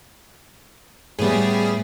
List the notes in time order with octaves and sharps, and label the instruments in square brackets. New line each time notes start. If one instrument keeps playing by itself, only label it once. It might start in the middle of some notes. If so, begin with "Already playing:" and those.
[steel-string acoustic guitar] A2 B3 [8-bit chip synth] G3 G#4